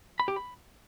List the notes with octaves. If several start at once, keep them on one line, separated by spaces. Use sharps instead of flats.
B5
G4
B5